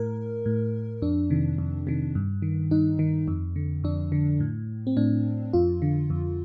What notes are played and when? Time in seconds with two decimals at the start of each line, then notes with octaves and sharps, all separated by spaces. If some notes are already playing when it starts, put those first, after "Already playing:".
Already playing: A2 A#4
0.46 A2
1.02 F2 D4
1.30 C3 D#3
1.58 F2
1.87 C3 D#3
2.15 G2
2.42 D#3
2.71 G2 D#4
2.99 D#3
3.28 F2
3.56 D3
3.84 F2 D4
4.12 D3
4.40 A2
4.87 C4
4.97 A2 D4
5.53 F2 F4
5.82 D3
6.10 F2